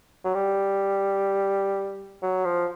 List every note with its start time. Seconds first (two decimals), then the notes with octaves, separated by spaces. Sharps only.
0.25 F#3
0.35 G3
2.23 F#3
2.45 F3